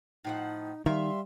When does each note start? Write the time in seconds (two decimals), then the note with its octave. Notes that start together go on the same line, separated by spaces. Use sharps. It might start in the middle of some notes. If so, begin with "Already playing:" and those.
0.25 A2 F3 D#4 F#5
0.86 D#3 G3 E5 F5 C6